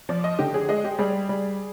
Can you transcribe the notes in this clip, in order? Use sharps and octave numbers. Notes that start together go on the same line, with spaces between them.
F3 D5
D#5
D3 G4
G#4
G#3 D#5
G4
G3 G#4
G3